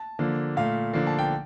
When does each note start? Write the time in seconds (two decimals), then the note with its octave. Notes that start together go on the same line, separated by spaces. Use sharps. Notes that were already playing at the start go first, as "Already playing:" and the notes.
Already playing: A5
0.19 D3 F3 A#3
0.56 A#2 A3 F5
0.93 D3 F3 A#3
1.07 A5
1.19 G5